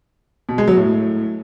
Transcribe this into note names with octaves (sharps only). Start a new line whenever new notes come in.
B2
G#3
F#3
A2